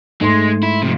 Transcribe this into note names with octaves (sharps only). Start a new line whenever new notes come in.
G#2 G#3 A3 C6
E4
C3 F3